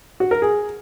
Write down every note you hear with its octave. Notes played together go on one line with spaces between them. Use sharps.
F#4
A#4
G#4